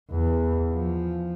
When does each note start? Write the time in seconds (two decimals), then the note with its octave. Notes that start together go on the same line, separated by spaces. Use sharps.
0.11 E2
0.71 F3